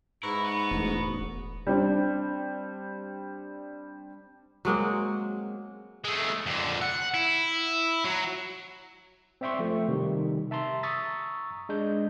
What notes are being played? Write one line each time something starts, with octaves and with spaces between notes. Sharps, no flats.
G#2 E4 B4 A#5 C#6
B3
E1 E2 A2
G3 C4 D4
F#3 G#3 A#3 C4
G#3 A3
F2 D3
F#5
E4
F#3
C4 D5 E5 G5 C6 C#6
F3 A3
C3 D#3 G3
E5 A5 A#5 C6
A#5 C#6 D#6 E6 A6 B6
G#3 D4 G6